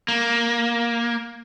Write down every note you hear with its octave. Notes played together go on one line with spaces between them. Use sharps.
A#3